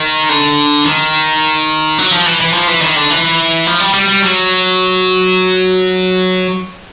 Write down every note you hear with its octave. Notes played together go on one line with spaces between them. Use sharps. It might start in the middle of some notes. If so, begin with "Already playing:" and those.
Already playing: D#3
D3
D#3
F#3
F3
E3
E3
F3
E3
D#3
D3
E3
F3
G3
G3
G3
F#3